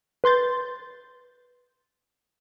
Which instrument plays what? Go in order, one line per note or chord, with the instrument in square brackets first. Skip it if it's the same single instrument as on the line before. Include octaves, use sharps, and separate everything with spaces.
[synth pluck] B4 C6 G6 A6